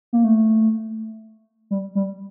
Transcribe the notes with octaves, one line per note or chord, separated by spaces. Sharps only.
A#3
A3
G3
G3